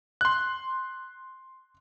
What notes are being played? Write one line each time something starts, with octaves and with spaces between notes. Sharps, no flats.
C6 F#6